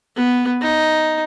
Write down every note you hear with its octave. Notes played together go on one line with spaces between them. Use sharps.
B3
D#4